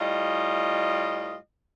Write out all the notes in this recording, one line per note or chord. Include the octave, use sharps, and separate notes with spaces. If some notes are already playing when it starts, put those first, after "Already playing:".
A2 G3 F4 D#5